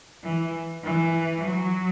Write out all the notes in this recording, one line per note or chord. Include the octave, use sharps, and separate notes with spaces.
E3
E3
F#3